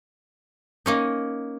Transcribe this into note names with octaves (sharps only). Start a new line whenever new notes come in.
A#3 C#4 D#4